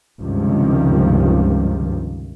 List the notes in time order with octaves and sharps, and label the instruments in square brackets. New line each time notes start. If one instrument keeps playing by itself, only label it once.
[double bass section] C#2 G2 C3 D#3 F3